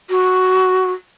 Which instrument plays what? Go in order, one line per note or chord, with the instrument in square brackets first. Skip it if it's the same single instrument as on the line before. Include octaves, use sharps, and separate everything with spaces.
[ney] F#4